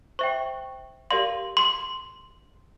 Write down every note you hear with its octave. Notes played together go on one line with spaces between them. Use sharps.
C5 E5 G5 C#6
G4 A#4 D5 F5 C6
C6